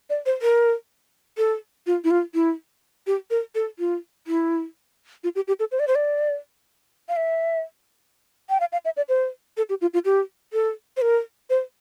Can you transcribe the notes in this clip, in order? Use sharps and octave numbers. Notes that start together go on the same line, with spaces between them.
D5
C5
A#4
A4
F4
E4
F4
E4
G4
A#4
A4
F4
E4
F4
G4
G4
A4
C5
D5
C5
D5
F5
E5
G5
F5
F5
E5
D5
C5
A4
G4
F4
F4
G4
A4
C5
A#4
C5